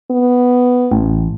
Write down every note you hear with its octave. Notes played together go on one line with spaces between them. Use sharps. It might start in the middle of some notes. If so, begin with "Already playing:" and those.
B3
A1